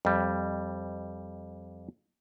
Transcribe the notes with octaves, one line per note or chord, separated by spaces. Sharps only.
F2 G3